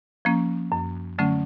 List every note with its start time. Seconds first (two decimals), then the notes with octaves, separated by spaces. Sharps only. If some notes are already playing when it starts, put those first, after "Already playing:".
0.25 F3 A#3 C#4
0.72 F#2
1.18 D3 F#3 A3 C#4